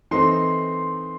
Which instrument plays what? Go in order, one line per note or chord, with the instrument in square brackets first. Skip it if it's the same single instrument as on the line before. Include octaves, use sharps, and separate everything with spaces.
[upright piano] E3 A3 C4 D#4 [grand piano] C6